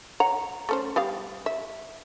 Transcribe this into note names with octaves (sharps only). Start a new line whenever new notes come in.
C#5 F#5 A#5
A3 C#4 C5
G3 B3 F5
E5